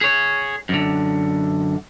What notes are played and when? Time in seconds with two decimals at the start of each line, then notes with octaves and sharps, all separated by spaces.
0.01 G#4 C#5
0.69 F#2 D3